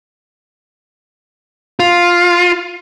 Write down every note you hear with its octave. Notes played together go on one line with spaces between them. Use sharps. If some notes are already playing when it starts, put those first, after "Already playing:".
F4